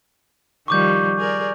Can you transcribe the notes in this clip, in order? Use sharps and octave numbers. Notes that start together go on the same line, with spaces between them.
D#3 F3 G3 C#6 D6 G6
G#4 A#4 D5